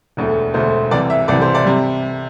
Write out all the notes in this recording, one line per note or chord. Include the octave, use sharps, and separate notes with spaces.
E1 D2 D3 A3
E1 D2 D3 A3 C5
C2 C3 E3 D5
E5
C2 C3 E3 D5
C5
D5
C3 G3